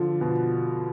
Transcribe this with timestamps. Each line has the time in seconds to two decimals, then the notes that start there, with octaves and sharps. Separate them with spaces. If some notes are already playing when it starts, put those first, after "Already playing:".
Already playing: D3 F3
0.21 B2